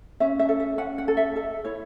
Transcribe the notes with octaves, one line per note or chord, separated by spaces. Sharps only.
C#4 E5
E5
A4
E5
C#4 F#5
F#5
A4
E5
A4 D#5
E4 C#5